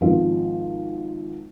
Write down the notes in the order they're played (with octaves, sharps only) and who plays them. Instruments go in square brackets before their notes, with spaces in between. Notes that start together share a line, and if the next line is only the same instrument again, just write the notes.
[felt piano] G#1 F3